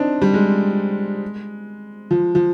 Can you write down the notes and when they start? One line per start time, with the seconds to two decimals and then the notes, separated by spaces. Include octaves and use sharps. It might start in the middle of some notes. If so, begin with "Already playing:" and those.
Already playing: C4 D4 D#4
0.22 G3
0.34 G#3
2.11 F3
2.35 F3